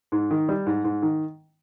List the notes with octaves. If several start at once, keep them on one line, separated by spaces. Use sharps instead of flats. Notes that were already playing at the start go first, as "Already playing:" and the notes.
G#2
D#3
G3
G#2
G#2
D#3